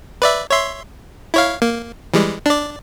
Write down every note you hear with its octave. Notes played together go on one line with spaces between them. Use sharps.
B4 D5 E5
C#5 E5 C6
E4 C#5 F5
A#3
E3 G3 G#3
D4 D5